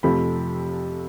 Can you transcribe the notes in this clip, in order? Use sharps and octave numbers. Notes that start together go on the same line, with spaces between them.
F2 C3 F3 A3 B5